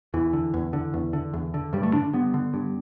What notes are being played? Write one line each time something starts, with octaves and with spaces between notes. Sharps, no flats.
E2 E3
D3
E2
D3
E2
D3
E2
D3
G2 G3
A3
D3 D4
G2 B3
D3
G2